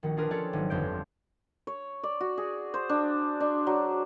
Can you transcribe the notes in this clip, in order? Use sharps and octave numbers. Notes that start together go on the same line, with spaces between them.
A#1 D#3 F#4
D4 F4 G#4 A#4 B4
C#4 F4 G4 A4 C#5 D5
G#1 F#3
G1 F2 D3 C5 G6 D7
C#5
D5
F#4
G#4
C5
D4
D4
F#3